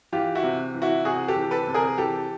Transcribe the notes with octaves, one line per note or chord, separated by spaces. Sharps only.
E3 F4 G4
E4 F#4
C3
E3
E4 F#4
C3 F#4 G#4
G4 A4
E3
A4 B4
C3
G#4 A#4
E3 G4 A4